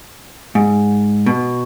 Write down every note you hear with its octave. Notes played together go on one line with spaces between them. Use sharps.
G#2
B2